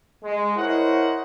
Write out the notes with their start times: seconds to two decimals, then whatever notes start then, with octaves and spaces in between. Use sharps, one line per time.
0.24 G#3
0.56 E4 A#4 C5 C#5 D#5 F#5